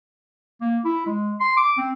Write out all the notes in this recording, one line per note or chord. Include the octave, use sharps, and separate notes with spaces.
A#3
E4
G#3
C6
D6
C4